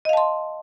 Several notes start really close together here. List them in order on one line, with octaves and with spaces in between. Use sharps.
D#5 F5 A5 C6